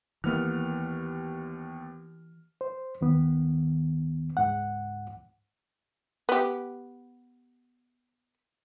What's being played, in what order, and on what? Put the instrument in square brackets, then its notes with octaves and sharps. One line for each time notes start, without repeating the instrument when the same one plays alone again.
[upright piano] D#2 B3 F6 [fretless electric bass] E3 A#3
[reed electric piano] C5
D#2 D#3 B3
C#2 G#2 F#5
[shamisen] B3 G4